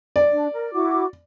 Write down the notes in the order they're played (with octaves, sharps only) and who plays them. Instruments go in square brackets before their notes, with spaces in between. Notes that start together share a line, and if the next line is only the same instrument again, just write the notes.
[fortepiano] D5
[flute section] D4
A#4
E4 F#4 D6